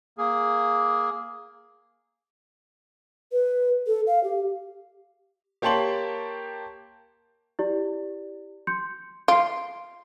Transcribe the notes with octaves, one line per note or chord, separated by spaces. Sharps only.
A#3 G#4
B4
A4
F5
G4
A#3 G4 C#5 A5 C6 F#7
E4 G4 D5
C6 G6 C#7
F4 C7 D7